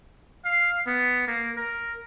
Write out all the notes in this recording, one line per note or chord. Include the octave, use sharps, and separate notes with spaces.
F5
B3
A#3
A#4